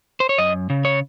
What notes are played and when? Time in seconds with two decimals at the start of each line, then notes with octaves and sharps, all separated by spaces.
0.20 C5
0.29 C#5
0.38 F#2 D#5
0.70 C#3
0.85 C#5